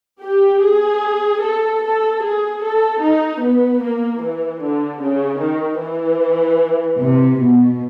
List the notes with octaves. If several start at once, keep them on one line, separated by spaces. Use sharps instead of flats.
G4
G#4
A4
A4
G#4
A4
D#4
B3
A#3
E3
D3
C#3
D#3
E3
C3
B2